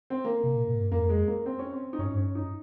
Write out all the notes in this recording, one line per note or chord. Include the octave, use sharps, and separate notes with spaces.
C4
A#3
C3
A#2
G#2
G2
F2 A#3
G#3
A#3
C4
C#4
C4
D#4
G2 C#4
G#2
G2 C#4
D#4